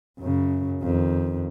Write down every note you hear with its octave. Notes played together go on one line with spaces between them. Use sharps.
F#2 C#3
F2 D#3